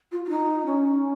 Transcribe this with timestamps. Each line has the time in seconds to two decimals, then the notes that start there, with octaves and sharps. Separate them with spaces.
0.12 F4
0.25 F4
0.29 D#4
0.66 C#4